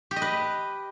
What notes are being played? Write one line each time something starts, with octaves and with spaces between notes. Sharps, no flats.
G4
D#5
B4